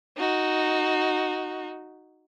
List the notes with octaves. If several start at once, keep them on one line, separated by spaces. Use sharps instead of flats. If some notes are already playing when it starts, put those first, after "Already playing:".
D#4 F#4